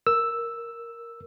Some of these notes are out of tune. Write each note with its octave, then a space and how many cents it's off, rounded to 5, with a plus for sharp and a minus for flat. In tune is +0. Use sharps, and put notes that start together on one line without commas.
A#4 +0 E6 +0